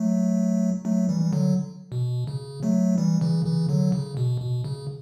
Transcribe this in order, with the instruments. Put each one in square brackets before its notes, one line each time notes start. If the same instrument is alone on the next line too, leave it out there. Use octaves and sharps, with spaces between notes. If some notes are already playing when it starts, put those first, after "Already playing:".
Already playing: [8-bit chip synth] F#3 A3
F#3 A3
E3 G3
G3
D3 F#3
B2
C#3
F#3 A3
E3 G3
C#3 E3
C#3 E3
D3 F#3
C#3
B2
B2
C#3